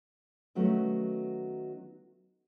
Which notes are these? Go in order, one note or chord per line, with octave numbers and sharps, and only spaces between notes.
D#3 F#3 A3 B3 C#4